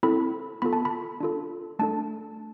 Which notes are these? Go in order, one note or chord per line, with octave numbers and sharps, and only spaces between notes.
C4 E4 A4 B5
B3 F4 A4 B5
A5
B5
D4 F4 A4
A3 D4 A4 A5